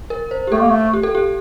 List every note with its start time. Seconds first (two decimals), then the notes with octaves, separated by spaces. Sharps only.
0.10 A#4
0.31 C5
0.47 G4
0.52 A3 A4
0.61 A#3
0.70 A3
0.93 G4
1.03 A4
1.15 G4